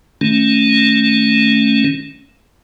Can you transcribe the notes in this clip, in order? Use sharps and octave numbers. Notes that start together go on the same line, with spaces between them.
D#3 A3 C#4